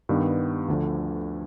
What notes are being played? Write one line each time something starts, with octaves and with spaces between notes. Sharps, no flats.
G2 D#3 G3 B3
D2 D3 F3